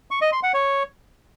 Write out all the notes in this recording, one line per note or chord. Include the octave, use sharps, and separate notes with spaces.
C#6
D#5
C6
F#5
C#5